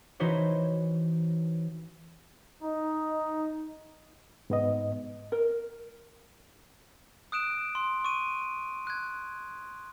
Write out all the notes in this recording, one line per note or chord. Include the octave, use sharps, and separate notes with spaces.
E3 D#4 E4 F#4 C5 C#5
D#4
G#2 B3 D#5
A#4
D#6 F#6 D7 E7
C6
C#6 D#7
F#6 G#6